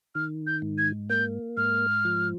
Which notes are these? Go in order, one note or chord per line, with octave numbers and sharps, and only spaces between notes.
D#3 F6
G6
G#2
G#6
A#3 G6
G#2 F6
F3